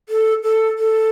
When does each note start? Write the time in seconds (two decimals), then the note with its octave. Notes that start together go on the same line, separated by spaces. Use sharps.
0.09 A4
0.43 A4
0.79 A4